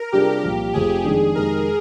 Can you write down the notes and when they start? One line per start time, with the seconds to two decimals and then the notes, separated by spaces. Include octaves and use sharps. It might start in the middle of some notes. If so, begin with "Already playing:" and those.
Already playing: A#4
0.12 C3 G3 D4 F4 G4 G#4
0.43 C2 A#2 F3
0.73 F1 F2 C3 F3 G#4
1.04 F2 D#3 G#3 D4
1.35 F2 C3 D#3 G#3 A#4